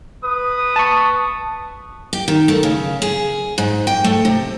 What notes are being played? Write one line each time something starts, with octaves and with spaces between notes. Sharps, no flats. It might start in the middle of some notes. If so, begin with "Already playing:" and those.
B4 D#6
A5 C#6
G4
D#3
A3
C#3
G#4
G#2
G5
A3
C3